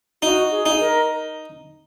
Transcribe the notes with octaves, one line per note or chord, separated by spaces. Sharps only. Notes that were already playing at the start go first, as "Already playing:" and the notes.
D#4 F#4
G#4
D#4
A#4